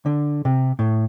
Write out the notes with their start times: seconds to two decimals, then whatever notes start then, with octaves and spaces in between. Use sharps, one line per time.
0.06 D3
0.45 C3
0.79 A2